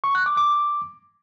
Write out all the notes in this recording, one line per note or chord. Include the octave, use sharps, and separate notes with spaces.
C#6
F#6
D6
D6